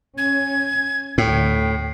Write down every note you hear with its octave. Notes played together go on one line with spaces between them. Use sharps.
C#4 G#6
D2 A2 G5